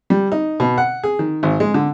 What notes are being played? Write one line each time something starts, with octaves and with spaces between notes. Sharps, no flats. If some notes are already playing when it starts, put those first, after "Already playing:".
G3
D#4
B2
F#5
G#4
D#3
G#1
G#3
D3